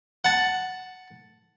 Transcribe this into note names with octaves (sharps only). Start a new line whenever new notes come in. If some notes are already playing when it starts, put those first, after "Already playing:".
F#5 A5